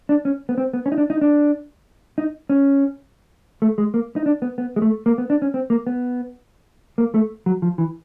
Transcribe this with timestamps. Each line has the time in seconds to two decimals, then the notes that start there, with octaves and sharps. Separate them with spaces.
0.09 D4
0.25 C#4
0.49 B3
0.58 C4
0.73 B3
0.86 C#4
0.92 D#4
0.98 D4
1.10 D#4
1.21 D4
2.18 D#4
2.50 C#4
3.62 A3
3.78 G#3
3.94 A#3
4.16 D#4
4.26 D4
4.42 B3
4.58 B3
4.76 G#3
4.82 A3
5.06 A#3
5.18 B3
5.30 D4
5.42 C#4
5.54 C4
5.70 A#3
5.87 B3
6.98 A#3
7.14 A3
7.46 F#3
7.62 F3
7.78 E3